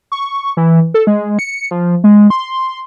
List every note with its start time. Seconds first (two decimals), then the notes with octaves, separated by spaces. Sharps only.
0.12 C#6
0.57 E3
0.94 A4
1.07 G#3
1.39 C#7
1.71 F3
2.04 G#3
2.30 C6